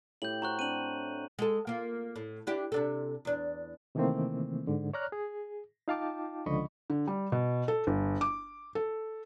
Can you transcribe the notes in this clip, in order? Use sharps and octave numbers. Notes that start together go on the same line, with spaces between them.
A2 G4 G6 F#7
F#4 C5 A#5 C#6 F#6
C4 D4 D#7 F#7
G#3 A4
A#3 F4
A2
D4 E4 G4
C3 D4 A4
E2 D4
C3 D#3 E3 A3 A#3 C4
G#2 D3
C#5 D5 A#5 F6 F#6
G#4
D#4 F4 F5 G5 A5 D6
C#2 D3 F3 D#5 B5 C#6
D3
G3
B2
A4
G1
D6
A4